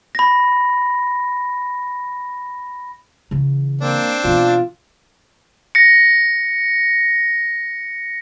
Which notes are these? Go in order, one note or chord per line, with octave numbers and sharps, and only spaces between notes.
B5 A#6
C#3 E3
A#3 C4 D4
B2 E3 F4
A#6 C#7